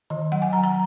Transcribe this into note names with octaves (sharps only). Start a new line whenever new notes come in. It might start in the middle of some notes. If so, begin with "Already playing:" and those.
D#3 D#5
F#3 F#5
G#5
F#3 A#5
A#5